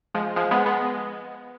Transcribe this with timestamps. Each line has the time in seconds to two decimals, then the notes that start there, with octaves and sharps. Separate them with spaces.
0.14 F3 G#3
0.36 F3 G#3
0.51 G#3 B3
0.66 G#3 B3